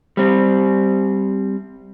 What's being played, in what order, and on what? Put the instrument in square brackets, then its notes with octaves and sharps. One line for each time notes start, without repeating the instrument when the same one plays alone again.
[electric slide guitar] G3 C4